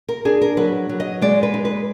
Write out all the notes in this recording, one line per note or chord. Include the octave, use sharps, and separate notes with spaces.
A#4
D4 G#4
A#4
F#3 B4
F#3
D#5
G#3 D5
B4
D#4
B4